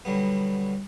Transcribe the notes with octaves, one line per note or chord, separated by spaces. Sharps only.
B2 D3 F#3 G3 B3